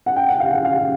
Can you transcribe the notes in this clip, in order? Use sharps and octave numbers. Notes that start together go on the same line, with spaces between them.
F#5
G5
F#5
F5
F#5
F5